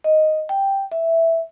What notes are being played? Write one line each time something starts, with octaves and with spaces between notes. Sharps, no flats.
D#5
G5
E5